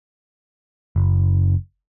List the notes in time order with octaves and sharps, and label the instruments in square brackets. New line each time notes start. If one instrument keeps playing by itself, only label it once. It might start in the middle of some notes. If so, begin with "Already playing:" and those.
[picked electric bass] F#1